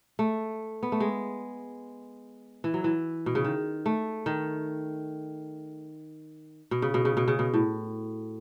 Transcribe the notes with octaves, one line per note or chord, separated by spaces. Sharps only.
A3
B3
A3
G#3
E3
F#3
E3
B2
C#3
D#3
A3
D#3
B2
C#3
B2
C#3
B2
C#3
B2
A2